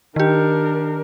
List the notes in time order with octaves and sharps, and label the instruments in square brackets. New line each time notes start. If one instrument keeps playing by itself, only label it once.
[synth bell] D#3 G4 [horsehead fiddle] D4 A#4